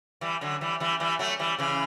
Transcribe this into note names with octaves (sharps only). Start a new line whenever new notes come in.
E3 G3
D3 F#3
E3 G3
E3 G3
E3 G3
F#3 A3
E3 G3
C#3 E3